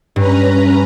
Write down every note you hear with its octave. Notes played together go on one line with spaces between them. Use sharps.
G2 C#4 B4 A#5